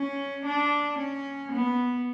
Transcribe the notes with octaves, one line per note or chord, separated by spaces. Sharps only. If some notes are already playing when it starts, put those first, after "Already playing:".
Already playing: C#4
D4
C#4
B3